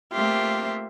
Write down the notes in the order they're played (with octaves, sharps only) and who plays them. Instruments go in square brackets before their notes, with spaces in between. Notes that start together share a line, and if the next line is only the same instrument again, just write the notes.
[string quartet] A3 A#3 C4 F4 G4 E5